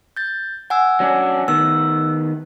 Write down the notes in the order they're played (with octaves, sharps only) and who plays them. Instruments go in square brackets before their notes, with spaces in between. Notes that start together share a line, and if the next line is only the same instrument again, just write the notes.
[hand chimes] G6 A6
F#5 G#5 E6
[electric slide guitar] F#3 C#4 D4
[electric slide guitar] D#3 B3 [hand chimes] E6